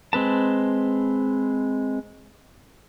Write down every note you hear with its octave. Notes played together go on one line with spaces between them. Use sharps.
G#3 C4 B4 A5